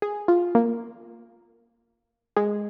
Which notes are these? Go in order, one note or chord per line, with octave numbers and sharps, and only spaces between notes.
G#4
F4
A#3
G#3